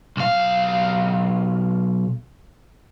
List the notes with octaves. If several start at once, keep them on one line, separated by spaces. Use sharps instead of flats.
B1 F5